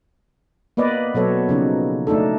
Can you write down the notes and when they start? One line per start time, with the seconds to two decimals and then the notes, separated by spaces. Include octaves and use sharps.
0.77 A#3 B3 B4 D5 D#5
1.14 B2 F#3 B3 A4 C#5
1.49 C#3 F3 D#4
2.07 A3 D4 D#4 A4